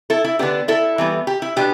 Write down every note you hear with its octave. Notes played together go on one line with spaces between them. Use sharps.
E4 A4
E4
D3 B3 D4 G4
E4 A4
E3 G3 B3
G4
E4
B2 B3 D4 G4